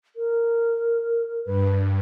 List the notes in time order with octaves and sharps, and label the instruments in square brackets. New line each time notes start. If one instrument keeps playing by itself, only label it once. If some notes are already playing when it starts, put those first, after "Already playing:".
[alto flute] A#4
[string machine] G2 [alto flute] B4